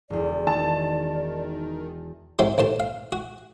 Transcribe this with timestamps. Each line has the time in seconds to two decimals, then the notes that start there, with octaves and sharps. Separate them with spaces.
0.10 E1 E2 D5
0.47 D#3 A5
2.39 G#2 C3 F#3 C6
2.58 A1 D#2 C5 A5
2.80 F5
3.12 F#4